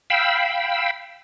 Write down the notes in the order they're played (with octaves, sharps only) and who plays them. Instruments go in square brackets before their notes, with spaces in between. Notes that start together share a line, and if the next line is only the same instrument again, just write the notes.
[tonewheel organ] F5 G5 B5 E6